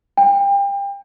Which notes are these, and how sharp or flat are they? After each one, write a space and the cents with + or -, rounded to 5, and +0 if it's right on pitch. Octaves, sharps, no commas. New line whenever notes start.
G5 +30